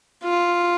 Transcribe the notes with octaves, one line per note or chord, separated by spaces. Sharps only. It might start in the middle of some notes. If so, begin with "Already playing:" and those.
F4